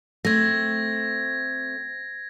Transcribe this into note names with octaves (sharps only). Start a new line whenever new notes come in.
A3 C4 G#6 A#6